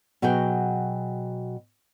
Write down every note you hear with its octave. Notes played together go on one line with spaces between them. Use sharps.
B2 F#3 F#4 G#4 G5